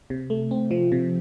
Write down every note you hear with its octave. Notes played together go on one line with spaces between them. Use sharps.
C3
A3
C4
F3
C3